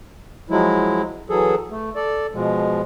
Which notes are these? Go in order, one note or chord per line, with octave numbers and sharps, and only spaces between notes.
F3 F#3 G#3 E4
E3 F#3 G#4 A4
A3
A4 D5
B2 F3 G#3